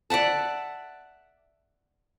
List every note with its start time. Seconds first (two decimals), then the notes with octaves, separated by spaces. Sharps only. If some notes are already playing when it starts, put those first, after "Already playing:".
0.10 D5 E5 F#5 A5